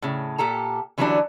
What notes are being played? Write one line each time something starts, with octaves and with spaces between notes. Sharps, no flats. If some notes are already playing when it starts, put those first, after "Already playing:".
A2 C#3
A#2 G4 A4 A#5
D3 E3 F#3 G3 C#4 D4